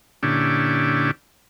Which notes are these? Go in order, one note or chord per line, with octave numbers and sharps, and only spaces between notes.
A#2 D3 C#4 D4 E4 G4